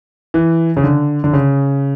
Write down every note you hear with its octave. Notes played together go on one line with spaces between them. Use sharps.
E3
C#3
D3
D3
C#3